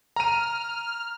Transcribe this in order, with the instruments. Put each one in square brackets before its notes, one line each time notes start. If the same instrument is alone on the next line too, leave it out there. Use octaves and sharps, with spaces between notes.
[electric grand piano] A#5 D#7 [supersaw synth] F6